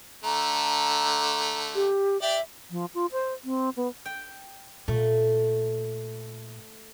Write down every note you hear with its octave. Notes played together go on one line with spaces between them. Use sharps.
D3 A3 A#5
G4
G4 D5 E5
F3
F4
C5
C4
B3
G5
A#2 A3